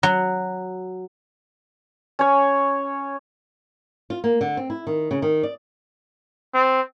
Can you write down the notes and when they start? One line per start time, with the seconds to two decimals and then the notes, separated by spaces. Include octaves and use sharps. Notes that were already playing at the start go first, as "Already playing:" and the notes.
0.03 F#3
2.19 C#4 C#5
4.10 F4
4.24 A#3
4.41 D3
4.57 C4
4.70 E4
4.87 D#3
5.11 C#3
5.22 D#3
5.43 D5
6.54 C4